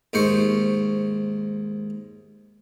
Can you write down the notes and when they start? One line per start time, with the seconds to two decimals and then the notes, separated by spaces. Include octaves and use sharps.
0.13 D#2 G#2 C5 C#6